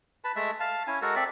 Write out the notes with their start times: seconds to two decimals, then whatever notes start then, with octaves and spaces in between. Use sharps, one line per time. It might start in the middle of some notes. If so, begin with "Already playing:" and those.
0.24 B4 A5 B5
0.36 G#3 A3 E5 A5
0.60 F5 A5
0.87 C#4 E4 G#5
1.02 G#3 F#4 A4 A#4
1.16 C4 A4 D5 E5